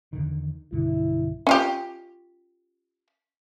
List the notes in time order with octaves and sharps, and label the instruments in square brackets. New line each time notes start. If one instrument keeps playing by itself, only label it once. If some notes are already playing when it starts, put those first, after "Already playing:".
[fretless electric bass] E2 D3 D#3
[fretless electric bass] B1 G2 D3 [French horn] E4
[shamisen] C#4 F4 G4